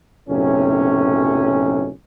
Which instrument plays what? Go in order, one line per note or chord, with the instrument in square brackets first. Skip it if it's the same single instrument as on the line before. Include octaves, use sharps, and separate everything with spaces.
[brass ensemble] F#1 B1 A2 C3 C#4